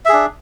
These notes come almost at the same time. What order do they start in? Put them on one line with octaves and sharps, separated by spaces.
E5 G#4 D4